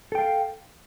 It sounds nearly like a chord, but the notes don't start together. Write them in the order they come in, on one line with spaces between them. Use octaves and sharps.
A4 G5 F5